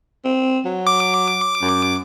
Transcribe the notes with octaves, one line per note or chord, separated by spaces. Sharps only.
C4
F#3
D6
F#2